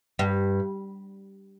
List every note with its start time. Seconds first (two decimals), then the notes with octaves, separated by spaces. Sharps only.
0.19 G2